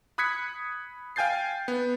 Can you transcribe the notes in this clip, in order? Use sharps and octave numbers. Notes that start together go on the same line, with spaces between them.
B5 D#6 F#6 G#6 B6 C#7
F5 G5 G#5 G6 A6 C7
B3